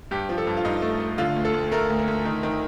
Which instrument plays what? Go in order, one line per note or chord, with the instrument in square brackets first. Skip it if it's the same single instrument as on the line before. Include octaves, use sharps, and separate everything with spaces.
[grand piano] G2 G4
F3
A4
G2
F4
G2 D#4
A3
A3
D3 F4
D2
A4
D2
A3 A#4
D2
A#4
D2
D#3
D#3